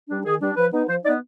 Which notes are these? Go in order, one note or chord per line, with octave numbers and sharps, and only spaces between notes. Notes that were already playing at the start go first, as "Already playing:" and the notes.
G3 D4
D#3 G#4
G3 D4
F3 B4
B3 D#4
F3 C5
B3 D#4 D5